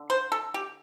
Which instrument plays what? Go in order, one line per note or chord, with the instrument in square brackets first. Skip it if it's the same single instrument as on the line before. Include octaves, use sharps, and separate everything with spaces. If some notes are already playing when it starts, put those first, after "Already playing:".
Already playing: [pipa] D3
C5
A4
G4